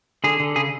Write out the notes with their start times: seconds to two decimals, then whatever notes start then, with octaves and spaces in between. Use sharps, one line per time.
0.24 D3 G#4
0.40 D3
0.56 C#3 G#4